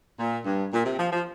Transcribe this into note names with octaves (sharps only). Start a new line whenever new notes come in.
A#2
G2
A#2
C3
F3
F3